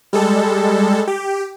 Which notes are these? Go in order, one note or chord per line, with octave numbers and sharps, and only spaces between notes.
G3 G#3 A4
G4